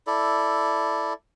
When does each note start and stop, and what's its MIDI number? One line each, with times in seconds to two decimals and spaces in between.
0.07 1.13 64
0.07 1.13 69
0.07 1.13 74